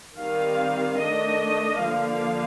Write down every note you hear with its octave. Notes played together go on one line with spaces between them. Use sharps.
D#3 G3 C4 F5
D#3 A3 D4 D#5
D3 F3 A#3 D4 F5